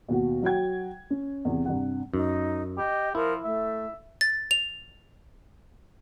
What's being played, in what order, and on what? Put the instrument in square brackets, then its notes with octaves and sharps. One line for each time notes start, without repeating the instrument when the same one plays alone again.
[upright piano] D#2 B2 F#4
F#3 F#4 G5 G#6
C#4
E2 C3
G2 C3 F#5
[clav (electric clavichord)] F#2 [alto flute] D#4
[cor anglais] G4 [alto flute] D#5
[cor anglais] F3 [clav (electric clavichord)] E4 [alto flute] A#4
[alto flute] A3 [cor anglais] E5
[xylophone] A6
F7